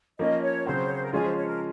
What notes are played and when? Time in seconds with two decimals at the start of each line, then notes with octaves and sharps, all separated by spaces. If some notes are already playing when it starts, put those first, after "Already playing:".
0.19 F3 A#3 C#4 D#5
0.42 C#5
0.66 C#3 F#3 C4 F#4 C5
0.84 C#5
0.94 C5
1.04 A#4
1.13 F3 G#3 C#4 F4 G#4
1.24 C5
1.37 C#5
1.47 A#4